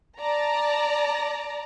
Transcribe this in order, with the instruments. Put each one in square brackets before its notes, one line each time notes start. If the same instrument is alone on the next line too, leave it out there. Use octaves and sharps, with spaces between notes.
[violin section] D5 A5 A#5